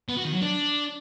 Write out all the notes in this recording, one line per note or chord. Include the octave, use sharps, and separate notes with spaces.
B3
F#4
D#3
F#3
D4